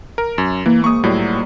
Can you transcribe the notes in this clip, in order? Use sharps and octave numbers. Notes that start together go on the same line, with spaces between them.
A#4
F#2
E3 A#3
G#2 A#3 C#6 D#6
A2 F#3 G3 D#4 F4 D5